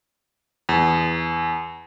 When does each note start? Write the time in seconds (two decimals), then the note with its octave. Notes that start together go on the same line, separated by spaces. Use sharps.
0.69 E2